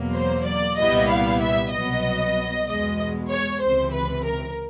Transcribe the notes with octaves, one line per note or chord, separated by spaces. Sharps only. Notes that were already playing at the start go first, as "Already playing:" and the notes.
Already playing: E2 B2 F#3 A#3
C5
D5
C2 A#2 G3 B3 E4 D#5
F5
E5
C2 B2 F#3 B3 D#5
E2 B2 G#3 D#5
C#5
C#2 C3 E3 C5
B4
A#4